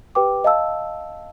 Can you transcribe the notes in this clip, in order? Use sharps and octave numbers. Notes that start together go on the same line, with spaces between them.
G4 B4 G5 D6
D#5 F5 A5 E6